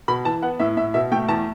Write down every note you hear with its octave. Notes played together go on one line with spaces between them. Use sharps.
B2 B5
E3 A5
B3 F#5
A2 E5
A2 E5
B2 E5
A3 G5
E2 A5